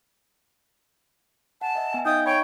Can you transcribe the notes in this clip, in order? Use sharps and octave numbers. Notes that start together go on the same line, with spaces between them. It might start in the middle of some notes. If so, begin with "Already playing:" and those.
F#5 G#5 A5
D#5 E5
B3 E5 G#5
D#4 D#5 F5 G5 D#6
C#5 G5 B5 C#6